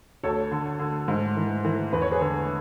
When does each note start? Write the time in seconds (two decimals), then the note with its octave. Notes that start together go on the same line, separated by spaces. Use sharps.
0.24 D2 A4 C#5
0.51 D3
0.79 D3
1.08 G#2
1.37 E3
1.65 E3
1.92 E2 B4
2.02 C#5
2.11 G#4 B4
2.21 D3